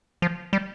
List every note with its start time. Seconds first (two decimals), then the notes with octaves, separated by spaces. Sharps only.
0.22 F3
0.53 G3